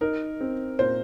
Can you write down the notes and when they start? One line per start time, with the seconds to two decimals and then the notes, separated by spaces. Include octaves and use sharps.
0.01 D#4 A#4
0.41 C4
0.79 A#2 C5